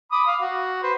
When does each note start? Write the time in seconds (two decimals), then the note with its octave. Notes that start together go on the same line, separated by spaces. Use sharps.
0.12 B5 D6 D#6
0.27 F5
0.41 F#4
0.83 B4 C5